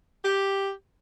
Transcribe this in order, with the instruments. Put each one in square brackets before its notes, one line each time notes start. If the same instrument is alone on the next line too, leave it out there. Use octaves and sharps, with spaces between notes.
[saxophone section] G4